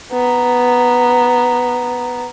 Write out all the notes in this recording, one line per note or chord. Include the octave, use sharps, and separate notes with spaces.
B3 A#5